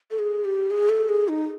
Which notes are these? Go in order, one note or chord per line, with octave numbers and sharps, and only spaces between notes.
A4
G#4
G4
G#4
A4
G#4
D#4